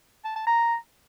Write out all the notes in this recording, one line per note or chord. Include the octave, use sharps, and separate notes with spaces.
A5
A5
A#5